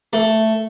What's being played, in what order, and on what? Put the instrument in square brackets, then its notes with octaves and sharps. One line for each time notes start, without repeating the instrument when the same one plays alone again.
[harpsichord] A3